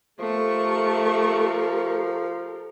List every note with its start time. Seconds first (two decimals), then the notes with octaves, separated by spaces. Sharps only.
0.19 F3 A3 G4 A4 A#4 C#6